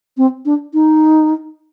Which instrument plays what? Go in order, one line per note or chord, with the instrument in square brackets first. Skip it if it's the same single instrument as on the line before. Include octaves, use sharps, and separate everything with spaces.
[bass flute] C4
D4
D#4